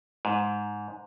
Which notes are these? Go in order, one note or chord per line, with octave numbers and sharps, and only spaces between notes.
G#2